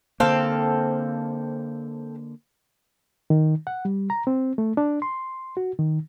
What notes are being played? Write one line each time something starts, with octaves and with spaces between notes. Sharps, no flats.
D3 A#3 C4 A4 F5
D#3
F#5
G3
A#5
C4
A3
D4
C6
F#4
D#3